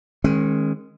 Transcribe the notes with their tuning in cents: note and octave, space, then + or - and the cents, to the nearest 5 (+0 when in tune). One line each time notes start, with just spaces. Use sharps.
D#3 +0 G#3 +0 C#4 -35